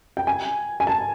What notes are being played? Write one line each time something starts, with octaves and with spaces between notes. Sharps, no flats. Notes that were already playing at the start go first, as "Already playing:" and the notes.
G5
G#5
G#5
A5